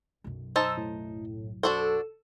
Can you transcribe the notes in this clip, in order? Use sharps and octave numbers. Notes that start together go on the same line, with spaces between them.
B1 F#2
D#4 C5 A5 E6
A2
D4 F#4 A4 C5